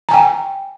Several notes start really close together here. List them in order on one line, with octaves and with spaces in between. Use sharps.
A#5 G#5 G5